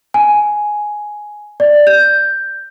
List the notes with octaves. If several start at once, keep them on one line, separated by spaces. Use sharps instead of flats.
G#5
D5
G6